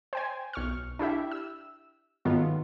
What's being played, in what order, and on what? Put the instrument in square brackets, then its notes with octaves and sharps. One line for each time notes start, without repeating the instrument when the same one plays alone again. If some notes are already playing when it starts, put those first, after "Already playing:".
[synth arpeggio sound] C5 G5 G#5
B1 C#6 F6
D4 E4 G4 E5
E6
G#2 D#3 F#3 A3 B3 F4